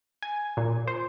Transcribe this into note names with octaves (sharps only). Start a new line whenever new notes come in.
G#5
A#2
C5